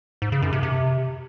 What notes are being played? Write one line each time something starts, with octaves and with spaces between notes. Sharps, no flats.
G#2
C#3
F#2
C3
C3